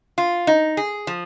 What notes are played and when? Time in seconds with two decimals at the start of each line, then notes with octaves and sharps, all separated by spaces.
0.18 F4
0.47 D#4
0.77 G#4
1.07 F3